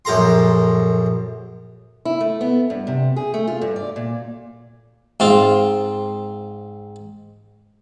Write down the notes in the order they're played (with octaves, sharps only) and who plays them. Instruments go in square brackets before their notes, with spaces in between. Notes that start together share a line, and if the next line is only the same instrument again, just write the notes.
[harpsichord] A#1 F#2 A4 A#5 C6
[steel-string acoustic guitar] E4
A3
B3
G2
C3
G#4
A3
F4
G2
D5
A#2
[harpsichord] G#2 C4 F4